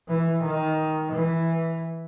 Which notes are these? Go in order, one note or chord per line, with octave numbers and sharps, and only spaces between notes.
E3
D#3
E3